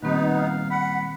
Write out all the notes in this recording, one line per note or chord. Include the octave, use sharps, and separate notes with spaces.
A#2 D#3 G3 B3 C4 D#4 B4
F5
F#5 B5